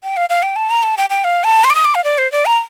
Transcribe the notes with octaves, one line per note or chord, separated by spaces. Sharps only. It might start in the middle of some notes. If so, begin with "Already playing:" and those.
G5
F5
F5
G5
A5
A#5
A5
G5
G5
F5
A5
C6
D6
D#6
D6
F5
D5
C5
D5
A#5